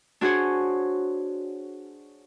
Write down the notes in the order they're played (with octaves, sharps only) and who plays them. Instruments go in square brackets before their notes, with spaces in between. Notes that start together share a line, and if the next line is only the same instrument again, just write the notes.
[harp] D4 F#4 G#4 C5 C#5